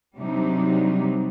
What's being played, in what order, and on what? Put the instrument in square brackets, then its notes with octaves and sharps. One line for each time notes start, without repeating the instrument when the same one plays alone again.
[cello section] C3 F#3 G3 D4 D#4